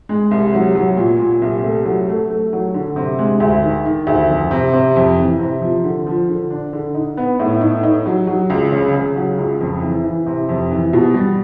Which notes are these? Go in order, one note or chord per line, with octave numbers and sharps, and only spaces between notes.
G#3
C2
F#3
F#3
A#2
A#2
C2
A3
F#3
A3
A3
F#3
D3
C3
G#3
D2
D#3
D#3
D2
F2
C3
C3
F2
E3
C3
F3
D3
F3
D3
D4
D3
D#4
B3
A2
D#4
D#4
F#3
F#3
C#2
C#3
C#3
F#3
C#2
F2
E3
E3
C3
F2
E3
B2
G3